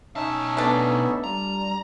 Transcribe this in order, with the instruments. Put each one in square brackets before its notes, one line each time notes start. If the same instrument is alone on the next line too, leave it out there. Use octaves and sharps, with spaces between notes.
[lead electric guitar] B1 A5 [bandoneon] C#4 D#4 E5
[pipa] A3 D4 [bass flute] B3
[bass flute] G3 [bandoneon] F4 [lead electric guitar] A#5